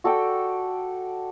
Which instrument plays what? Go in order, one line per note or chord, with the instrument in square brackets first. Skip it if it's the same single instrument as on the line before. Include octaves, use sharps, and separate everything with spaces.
[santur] F#4 A4 D5 G5